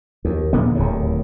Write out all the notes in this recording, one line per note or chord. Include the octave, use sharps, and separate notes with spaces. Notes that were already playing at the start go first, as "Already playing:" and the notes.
D#2
A#1 A#2 D3 B3
D1 D#2 A2